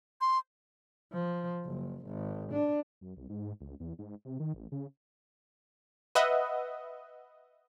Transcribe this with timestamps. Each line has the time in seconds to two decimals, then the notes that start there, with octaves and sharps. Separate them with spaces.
0.21 C6
1.13 F3
1.66 F#1
2.06 G#1
2.52 D4
3.01 F#2
3.17 C2
3.29 G#2
3.61 C#2
3.80 E2
3.99 G#2
4.25 C3
4.40 D#3
4.54 A1
4.72 C#3
6.15 B4 D#5 E5 F#5